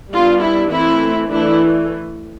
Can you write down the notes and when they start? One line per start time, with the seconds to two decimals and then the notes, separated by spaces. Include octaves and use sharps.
0.13 G3 B3 D4 F4
0.42 E4
0.72 E3 A3 C4 E4
1.31 E3 A3 D4 E4